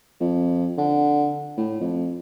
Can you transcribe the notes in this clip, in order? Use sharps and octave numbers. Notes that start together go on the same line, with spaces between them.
F2
D3
A2
F2